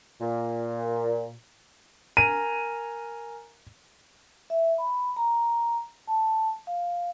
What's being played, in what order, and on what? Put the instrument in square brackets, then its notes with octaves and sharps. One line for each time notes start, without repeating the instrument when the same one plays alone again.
[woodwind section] A#2
[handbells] A#4 G#5 A#5 [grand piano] D#7
[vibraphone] E5
B5
A#5
A5
F5